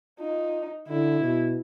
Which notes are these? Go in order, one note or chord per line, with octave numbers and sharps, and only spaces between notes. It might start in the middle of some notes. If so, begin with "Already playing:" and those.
D#4 F4
D3 E4
B2